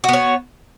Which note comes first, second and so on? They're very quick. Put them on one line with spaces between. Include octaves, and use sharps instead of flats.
F#4 B3 C#5